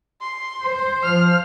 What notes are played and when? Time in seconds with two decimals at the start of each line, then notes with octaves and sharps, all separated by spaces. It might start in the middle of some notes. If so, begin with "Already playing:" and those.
0.21 C6
0.63 C5
1.03 F3 F6